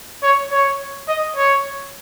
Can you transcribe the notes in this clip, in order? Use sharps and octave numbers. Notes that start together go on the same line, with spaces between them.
C#5
C#5
D#5
C#5